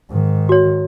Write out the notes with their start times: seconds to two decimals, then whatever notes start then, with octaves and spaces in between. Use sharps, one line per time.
0.11 G#2 D#3
0.49 F#4 C#5